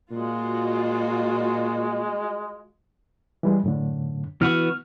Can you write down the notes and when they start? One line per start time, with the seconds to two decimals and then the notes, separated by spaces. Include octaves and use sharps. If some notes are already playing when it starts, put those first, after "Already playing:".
0.11 A#2 G#3 F4 F#4
3.43 E3 G3 G#3
3.63 F#2 A2 D3
4.41 E3 B3 F#4 F6